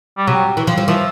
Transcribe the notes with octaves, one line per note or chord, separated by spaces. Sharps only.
G3
C3 F#3
E3
F3
F3
E3 F3